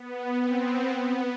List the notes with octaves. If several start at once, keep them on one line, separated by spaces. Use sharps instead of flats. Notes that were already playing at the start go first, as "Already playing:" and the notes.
Already playing: B3
C4
B3